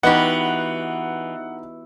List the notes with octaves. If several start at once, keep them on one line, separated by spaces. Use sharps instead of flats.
E3 B3 D#4 F#4 G4 D#5 F#5